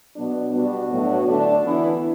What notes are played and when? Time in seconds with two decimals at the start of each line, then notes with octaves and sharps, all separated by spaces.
0.16 B2 F#3 B3 D4
0.53 B2 G3 B3 D4 F#4
0.90 A2 F#3 B3 D4
1.27 D3 A3 D4
1.64 E3 B3 D4 E4